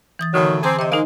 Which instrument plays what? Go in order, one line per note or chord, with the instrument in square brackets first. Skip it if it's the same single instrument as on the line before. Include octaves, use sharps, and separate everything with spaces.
[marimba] E3 D#6 A6
[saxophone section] A2 D#3 F#3 [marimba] D3
[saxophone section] C4 G#4 [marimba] A5 A#5 D6
[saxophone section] C3 [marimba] C5 D#5
[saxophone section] G#3 A#3 [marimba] D#4 D#5